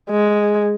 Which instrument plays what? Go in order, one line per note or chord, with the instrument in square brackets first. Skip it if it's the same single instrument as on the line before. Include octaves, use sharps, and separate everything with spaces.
[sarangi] G#3